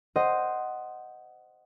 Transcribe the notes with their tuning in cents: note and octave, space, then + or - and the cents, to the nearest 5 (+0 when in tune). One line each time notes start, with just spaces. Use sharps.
C5 +0 D#5 +0 F#5 +10